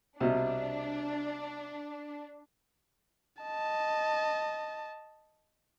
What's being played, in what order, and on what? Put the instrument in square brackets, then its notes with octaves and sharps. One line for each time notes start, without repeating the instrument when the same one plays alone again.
[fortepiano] C2 B2 [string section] D4
[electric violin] D#5 A5